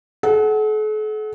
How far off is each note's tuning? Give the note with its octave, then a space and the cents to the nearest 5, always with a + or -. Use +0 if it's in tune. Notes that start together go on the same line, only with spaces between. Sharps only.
A4 -45 F#5 +5